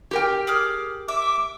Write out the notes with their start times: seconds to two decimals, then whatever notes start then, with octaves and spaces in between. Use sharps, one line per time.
0.11 G4 A#4 G5
0.47 G#4 D6 F6
1.08 E5 D6